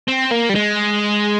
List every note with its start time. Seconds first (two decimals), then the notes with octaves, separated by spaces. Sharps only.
0.08 C4
0.31 A#3
0.50 G3
0.55 G#3